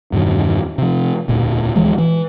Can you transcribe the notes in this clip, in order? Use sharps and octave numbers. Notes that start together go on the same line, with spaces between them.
E2 G2 B2 D#3
C3 F3
E1 D2 A#2
D2 E3 F3 G#3
E3